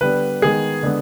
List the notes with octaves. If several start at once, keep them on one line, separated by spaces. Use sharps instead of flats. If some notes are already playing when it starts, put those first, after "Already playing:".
D3 G3 B3 B4
D#3 G#3 B3 G#4
D3 G#3 B3